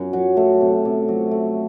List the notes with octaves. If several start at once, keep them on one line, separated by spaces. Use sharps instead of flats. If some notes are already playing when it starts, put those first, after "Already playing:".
Already playing: F#2
F#3
A3
C3
C3
F#3
A3